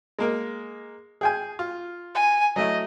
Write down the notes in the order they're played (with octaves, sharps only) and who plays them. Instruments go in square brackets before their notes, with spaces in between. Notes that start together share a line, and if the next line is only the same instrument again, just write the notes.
[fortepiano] G#3 A#3 A#4
G#4 G5 G#5
F4
[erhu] G#5
[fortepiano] F#3 A3 E4 [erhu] D#5